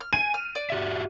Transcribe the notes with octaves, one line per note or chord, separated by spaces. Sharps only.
F6
G#5 D#7
F6
D5
F#4 G4 E5